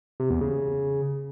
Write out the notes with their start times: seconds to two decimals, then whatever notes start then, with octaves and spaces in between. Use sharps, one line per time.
0.20 C3
0.30 E2
0.41 C#3